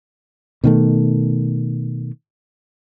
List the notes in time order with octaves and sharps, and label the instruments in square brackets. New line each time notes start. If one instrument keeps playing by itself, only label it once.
[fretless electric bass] B2 D#3 A3